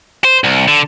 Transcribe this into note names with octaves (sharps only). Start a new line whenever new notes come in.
C5
C2
D3